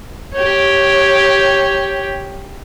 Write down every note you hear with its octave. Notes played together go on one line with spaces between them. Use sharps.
G4 C#5